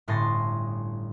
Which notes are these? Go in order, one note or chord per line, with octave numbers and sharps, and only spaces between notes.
G1 A2 C#4 C6 A6 A#6